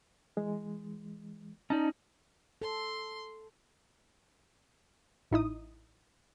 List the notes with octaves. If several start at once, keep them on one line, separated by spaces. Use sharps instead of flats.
E3 G#3
C#4 D#4 D5 D#5 A5 A#5
A4 C6
A1 D#4 E4 D#6